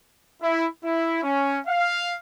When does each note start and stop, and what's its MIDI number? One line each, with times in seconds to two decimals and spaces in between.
0.42 0.67 64
0.83 1.20 64
1.23 1.59 61
1.67 2.17 77